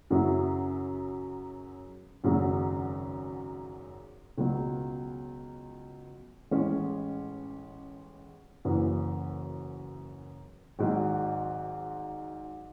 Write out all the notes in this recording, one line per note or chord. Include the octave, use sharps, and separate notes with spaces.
F#2 C#3 F#3 C#4 E4
G#1 F#2 C#3 F#3
C#2 B2 F#3
A1 A2 G#3 C#4
F#1 F#2 E3
G#1 G#2 F#3